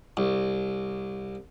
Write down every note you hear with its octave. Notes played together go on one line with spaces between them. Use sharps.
C2